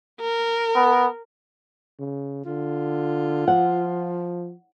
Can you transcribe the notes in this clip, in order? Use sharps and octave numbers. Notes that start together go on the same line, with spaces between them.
A#4
B3
C#3
D3 F4
F3 F#5